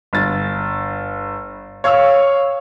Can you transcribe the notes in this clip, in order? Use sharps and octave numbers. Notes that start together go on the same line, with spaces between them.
G1 A6
C#5 F5 C#6 E6